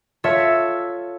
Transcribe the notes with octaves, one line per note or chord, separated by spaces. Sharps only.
F4 A4 C#5 E5